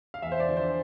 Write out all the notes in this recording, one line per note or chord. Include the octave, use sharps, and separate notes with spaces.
F5
E2 E5
C5
D5
D3 F3
C5